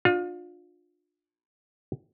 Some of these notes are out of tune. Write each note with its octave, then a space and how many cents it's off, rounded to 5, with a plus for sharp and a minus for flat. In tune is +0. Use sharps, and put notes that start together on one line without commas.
D4 +20 F4 +30